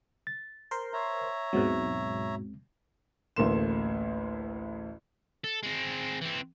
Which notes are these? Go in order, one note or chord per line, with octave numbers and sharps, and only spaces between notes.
A6
A#4 C5 C6
C#5 E5 A#5
D#2 G#2 B2 F#3 G#3 C4
A1 D2 A3 A#3 C6 E7
A4
G#3 C4
E3 C4